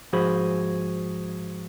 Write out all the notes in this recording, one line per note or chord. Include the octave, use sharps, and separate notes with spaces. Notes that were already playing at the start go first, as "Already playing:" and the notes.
G#2 F3 F#4 G#4 C5 B5